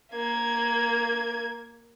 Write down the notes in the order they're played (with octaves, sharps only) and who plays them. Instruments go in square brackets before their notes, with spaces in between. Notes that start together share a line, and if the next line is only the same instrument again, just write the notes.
[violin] A#3 G#6